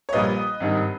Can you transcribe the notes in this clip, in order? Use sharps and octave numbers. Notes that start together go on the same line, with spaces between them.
C#5
A#1 A#2 G3 A#3 B4 D#5
G#1 G2 D#3